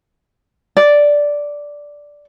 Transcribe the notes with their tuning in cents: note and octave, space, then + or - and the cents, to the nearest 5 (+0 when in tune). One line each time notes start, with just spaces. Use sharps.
D5 -5